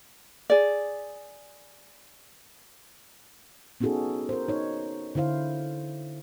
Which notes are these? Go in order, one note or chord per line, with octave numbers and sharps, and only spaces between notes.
G#4 D5
B3 C#4 D#4 F#4 G#4 A4
A#4 C5
D#4 C#5
D3 E4 C5 F5